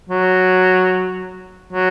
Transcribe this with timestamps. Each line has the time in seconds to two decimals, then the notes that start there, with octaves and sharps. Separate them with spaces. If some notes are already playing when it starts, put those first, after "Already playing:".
0.10 F#3
1.73 F#3